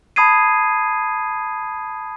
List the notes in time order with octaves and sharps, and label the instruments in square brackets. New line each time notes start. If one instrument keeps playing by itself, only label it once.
[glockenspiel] A5 B5 D#6 G#6 C7 D#7